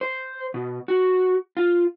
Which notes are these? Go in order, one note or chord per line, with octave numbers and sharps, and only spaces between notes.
C5
B2
F#4
F4